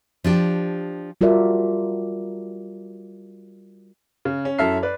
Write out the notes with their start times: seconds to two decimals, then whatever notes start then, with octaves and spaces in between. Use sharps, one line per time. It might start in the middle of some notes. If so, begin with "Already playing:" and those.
0.24 F3 D4 G4
1.21 G3 F4 F#4 A#4 D5 E5
4.25 C#3
4.45 C#4
4.58 F#2 E4 A4 E5 F6 C7
4.83 B4 D5